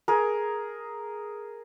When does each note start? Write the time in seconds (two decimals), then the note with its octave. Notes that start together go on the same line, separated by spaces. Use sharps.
0.08 G#4 A#4